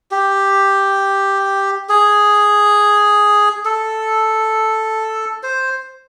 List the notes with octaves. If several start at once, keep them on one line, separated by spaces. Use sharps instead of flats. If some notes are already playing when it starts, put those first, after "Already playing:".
G4
G#4
A4
C5